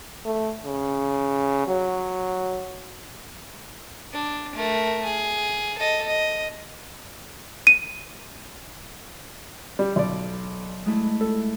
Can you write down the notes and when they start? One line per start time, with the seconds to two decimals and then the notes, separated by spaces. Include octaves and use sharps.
0.25 A3
0.65 C#3
1.68 F#3
4.13 D4
4.55 A3 A#4
5.04 G#4
5.78 A4 D#5
6.07 D#5
7.67 D#7
9.79 G3
9.96 B1 D5
10.86 G#3 A3 E4
11.21 A4